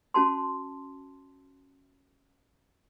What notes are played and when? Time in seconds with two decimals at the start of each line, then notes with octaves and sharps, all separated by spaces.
0.14 C#4 F#4 A5 C6